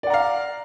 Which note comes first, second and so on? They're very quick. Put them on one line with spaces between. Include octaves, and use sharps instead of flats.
D5 F#5 A#5 F5